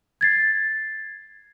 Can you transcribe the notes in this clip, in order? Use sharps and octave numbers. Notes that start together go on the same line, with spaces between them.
G#6 A6 C7